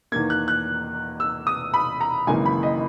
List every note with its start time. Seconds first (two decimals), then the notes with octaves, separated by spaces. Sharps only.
0.12 E2 D#3 A#3 G#6
0.30 F#6
0.48 F#6
1.20 E6
1.47 D#6
1.74 B5
2.01 A#5
2.27 G#1 F#2 C#3 E3 A#3 G#5
2.46 B5
2.63 D#5